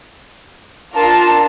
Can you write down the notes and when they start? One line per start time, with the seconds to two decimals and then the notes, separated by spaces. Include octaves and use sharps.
0.95 D4 F4 A#4 A5